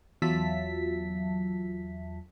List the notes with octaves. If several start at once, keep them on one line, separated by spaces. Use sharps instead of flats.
E2 F#3 F4 E5 A5 B6